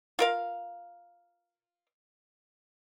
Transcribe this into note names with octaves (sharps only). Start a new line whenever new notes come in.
F4 A#4 F5